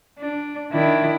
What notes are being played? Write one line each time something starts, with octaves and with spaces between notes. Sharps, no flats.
D4
D#3 D4 E4